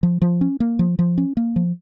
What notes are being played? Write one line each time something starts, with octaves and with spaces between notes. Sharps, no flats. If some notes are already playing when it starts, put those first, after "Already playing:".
F3
F3
C#4
A#3
F3
F3
C#4
A#3
F3